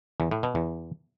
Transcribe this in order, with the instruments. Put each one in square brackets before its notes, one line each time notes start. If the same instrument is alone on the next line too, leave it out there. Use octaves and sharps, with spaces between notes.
[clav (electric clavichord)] E2
A2
B2
E2